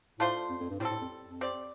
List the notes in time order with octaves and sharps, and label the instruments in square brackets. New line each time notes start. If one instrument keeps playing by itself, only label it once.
[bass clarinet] A2 [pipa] A3 D4 F4 C5
[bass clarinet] F2
F2
G2
[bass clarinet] A2 [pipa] G3 C4 A4
[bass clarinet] A2
F2
F2
[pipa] C4 G4 D5